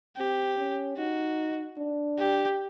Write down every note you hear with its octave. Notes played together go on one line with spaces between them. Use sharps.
C4 G4
C#4
D#4 F#4
D4
G4